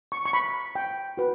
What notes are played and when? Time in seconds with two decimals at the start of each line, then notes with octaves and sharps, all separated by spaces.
0.12 C#6
0.26 C#6
0.33 B5
0.75 G5
1.17 F#4 B4